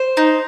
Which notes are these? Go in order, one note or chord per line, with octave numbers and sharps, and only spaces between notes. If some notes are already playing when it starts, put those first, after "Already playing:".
Already playing: C5
D#4